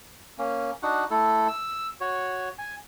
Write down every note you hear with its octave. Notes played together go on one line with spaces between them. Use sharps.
A#3 C#4
D4 D#4 F#4 F#5
A3 E4 A4
E6
F#4 C#5
G#5